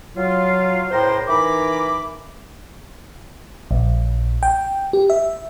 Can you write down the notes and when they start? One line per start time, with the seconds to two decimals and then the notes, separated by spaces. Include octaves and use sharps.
0.16 F#3 F4
0.91 C#2 A2 C5 G5 A#5 C6
1.27 E3 D#4 A#4 B5 D6
3.71 A#1
4.43 G5
4.93 G4
5.10 E5